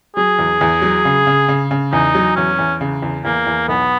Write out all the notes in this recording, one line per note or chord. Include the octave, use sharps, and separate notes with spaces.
F#3 G#4
E2
E2
F#3
C#3
C#3
C#3
C#3
E2 D#4
F#3
E2 C#4
E2
C#3
E2
E2 A#3
E2
B1 B3